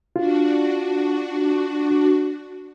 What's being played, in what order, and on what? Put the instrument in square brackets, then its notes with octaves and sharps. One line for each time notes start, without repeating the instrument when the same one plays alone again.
[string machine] D4 F#4 [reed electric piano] F4